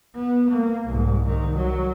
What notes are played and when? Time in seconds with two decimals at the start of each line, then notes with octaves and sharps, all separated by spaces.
0.16 B3
0.52 A#3
0.87 C2 G#2
1.24 C2 D#3
1.57 F#3